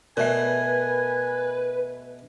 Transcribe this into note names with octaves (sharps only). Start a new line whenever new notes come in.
B2 A3 A#4 B4 E5 G#5